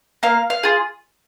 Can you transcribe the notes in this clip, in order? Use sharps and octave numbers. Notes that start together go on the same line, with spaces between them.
A#3 F5
F5
F4 G#4